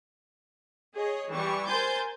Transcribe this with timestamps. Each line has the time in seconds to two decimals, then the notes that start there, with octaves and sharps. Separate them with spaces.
0.95 G#4 C#5 D#5
1.31 E3 G3 C#6
1.67 A#4 C5 G#5 C6 G6 A6